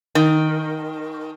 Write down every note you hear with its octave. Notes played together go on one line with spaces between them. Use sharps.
D#3